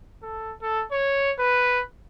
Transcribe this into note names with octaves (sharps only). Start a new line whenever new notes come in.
A4
A4
C#5
B4